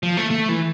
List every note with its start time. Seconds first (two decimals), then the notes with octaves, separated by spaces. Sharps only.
0.03 F3
0.17 A3
0.31 A3
0.49 E3